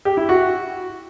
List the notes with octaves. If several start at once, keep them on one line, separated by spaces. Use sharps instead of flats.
G4
E4
F#4